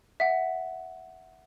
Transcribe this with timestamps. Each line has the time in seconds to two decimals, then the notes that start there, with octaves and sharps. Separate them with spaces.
0.20 E5 F#5